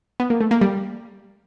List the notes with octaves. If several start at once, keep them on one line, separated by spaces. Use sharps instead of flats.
B3
A#3
A3
A#3
G3